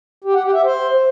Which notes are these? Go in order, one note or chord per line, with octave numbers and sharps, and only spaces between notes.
G4
F#5
G4
E5
C5